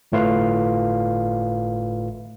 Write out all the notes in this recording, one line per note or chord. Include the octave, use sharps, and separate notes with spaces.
G1 A2 A3 F4 B4 F5